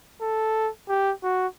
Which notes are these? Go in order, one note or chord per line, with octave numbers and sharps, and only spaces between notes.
A4
G4
F#4